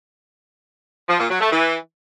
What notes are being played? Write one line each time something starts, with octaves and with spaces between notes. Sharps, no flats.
F3
A#2
F#3
A3
E3